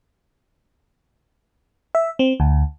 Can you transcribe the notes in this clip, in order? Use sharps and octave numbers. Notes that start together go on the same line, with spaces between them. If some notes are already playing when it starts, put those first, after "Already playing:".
E5
C4
D2